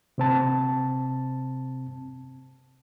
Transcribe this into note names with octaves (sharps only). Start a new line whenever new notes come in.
C3 C4 A5